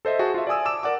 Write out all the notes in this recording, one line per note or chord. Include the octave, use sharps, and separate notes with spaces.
A4 C5 D#5 E5
F#4 G#4 F#5 A5
F4 E5
D5 E5 G#5 D#6 E6
A5 D6 E6 E7
A#4 D5 F#5 D6